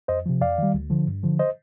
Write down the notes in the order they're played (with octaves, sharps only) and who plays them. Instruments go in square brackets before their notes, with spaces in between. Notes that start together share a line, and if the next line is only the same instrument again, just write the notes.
[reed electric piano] F2 C5 D#5
C3 F3
F2 D5 F5
D#3 G3
D2
D3 F3
G2
D3 F3
C5 D#5